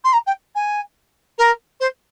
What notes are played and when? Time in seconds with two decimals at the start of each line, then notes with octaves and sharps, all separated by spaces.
0.04 C6
0.13 A#5
0.26 G5
0.55 G#5
1.38 A#4
1.80 C5